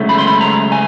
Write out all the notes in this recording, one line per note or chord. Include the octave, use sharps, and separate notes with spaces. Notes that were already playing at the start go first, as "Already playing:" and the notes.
Already playing: C#2 C#3 F#3 A3
B5
C6
B5
A#5
G#5